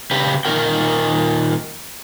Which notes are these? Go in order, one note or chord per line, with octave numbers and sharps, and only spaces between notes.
C#3 G4 B4
A#2 D#3 D4 F#4 A#4 G5